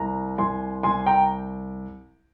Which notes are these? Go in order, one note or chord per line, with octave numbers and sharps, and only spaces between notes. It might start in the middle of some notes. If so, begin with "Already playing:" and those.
Already playing: C2 A#5
C2 G#5 C6
C2 G#5 C6
G5 A#5